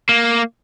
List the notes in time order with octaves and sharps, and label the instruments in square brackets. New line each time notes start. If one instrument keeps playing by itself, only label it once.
[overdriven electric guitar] A#3